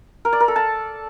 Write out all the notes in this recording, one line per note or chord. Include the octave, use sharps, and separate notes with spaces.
A#4
D5
A#4
A4
A5